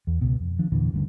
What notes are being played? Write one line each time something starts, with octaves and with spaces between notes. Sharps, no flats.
E2
C#2 B2
F2
D#3 F3 D4
E2 A#2 D3 E3
G1 D2 G2 C#3